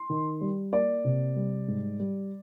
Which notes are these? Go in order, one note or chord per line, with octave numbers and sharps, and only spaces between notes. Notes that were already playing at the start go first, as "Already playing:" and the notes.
Already playing: C6
D#3
G3
A#3 D5
C3
G3
G#2
G3